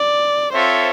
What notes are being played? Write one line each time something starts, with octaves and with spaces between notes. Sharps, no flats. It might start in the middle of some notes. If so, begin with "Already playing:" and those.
Already playing: D5
C4 F4 A4 C5 C#5 E5